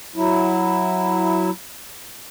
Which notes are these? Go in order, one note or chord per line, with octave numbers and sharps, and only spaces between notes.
F#3 E4